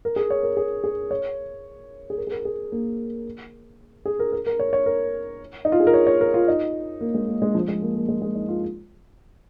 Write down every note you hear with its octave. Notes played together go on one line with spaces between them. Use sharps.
A#4
G#4
C#5
A#4
G#4
G#4
C#5
G#4
A#4
G#4
A#4
G#4
A#3
G#4
A#4
A#4
A#4
C#5
C#5
A#4
D#4
F4
G#4
A#4
C#5
C#5
A#4
F4
D#4
A#3
G#3
A#3
G#3
F3
G#3
A#3
A#3
G#3
G#3
D#4
F4